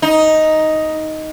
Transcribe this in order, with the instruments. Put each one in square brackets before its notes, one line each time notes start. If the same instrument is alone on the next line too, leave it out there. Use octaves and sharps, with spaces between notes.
[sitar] D#4